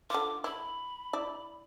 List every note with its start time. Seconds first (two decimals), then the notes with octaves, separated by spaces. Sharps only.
0.10 D3 F4 D6
0.44 E4 B5
1.13 E4 D5